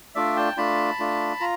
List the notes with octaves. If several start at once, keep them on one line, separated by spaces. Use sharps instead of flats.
A3 D4 F4 D5 E5
G5 A5
A3 D4 F4 A5 B5
A3 D4 F4
F4 A#5